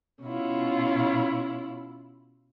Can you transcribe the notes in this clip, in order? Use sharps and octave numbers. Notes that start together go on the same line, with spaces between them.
B2 C#4 E4 F4